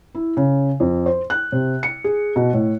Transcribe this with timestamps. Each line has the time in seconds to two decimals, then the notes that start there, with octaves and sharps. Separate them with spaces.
0.15 E4
0.37 C#3
0.80 F2
1.06 C5
1.30 F#6
1.52 C3
1.83 C#7
2.04 G#4
2.36 B2
2.53 A2